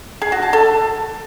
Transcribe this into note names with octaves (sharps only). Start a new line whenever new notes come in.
G#4
F#4
A5
A4